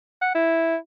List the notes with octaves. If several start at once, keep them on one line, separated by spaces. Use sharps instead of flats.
F#5
E4